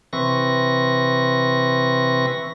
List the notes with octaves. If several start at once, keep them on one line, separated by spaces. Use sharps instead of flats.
C3 E3 C4 B4 C#6 A#6